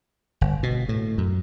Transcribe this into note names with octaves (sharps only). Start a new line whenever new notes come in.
G1
B2
A2
F#2